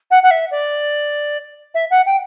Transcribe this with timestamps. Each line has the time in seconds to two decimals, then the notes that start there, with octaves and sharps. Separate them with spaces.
0.10 F#5
0.22 F#5
0.30 E5
0.51 D5
1.74 E5
1.90 F#5
2.06 G5